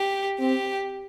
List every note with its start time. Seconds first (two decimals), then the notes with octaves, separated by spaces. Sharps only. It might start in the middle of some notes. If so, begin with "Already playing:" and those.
Already playing: G4
0.40 C4 G4